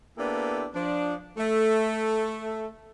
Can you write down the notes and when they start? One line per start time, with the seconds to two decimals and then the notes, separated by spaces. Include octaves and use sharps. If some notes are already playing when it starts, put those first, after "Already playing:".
0.18 A#3 B3 D4 E4 G4 A4
0.74 F3 D4
1.37 A3 A4